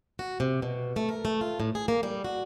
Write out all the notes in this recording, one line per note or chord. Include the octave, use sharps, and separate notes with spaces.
F#4
C3
B2
A3
A#4
A3
F4
A2
G#4
A#3
G3
F#4